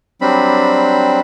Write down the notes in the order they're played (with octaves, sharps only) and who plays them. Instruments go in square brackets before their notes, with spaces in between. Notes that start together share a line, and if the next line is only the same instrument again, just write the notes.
[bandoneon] F#3 G3 C4 D4 B5